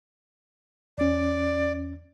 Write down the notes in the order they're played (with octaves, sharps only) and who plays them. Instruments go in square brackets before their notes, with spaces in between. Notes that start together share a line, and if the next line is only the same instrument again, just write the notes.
[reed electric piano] E2 C#4 [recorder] D5